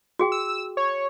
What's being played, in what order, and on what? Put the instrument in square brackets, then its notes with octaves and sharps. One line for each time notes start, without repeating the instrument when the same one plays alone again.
[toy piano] F#4 G#4 G5
[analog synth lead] E6
C#5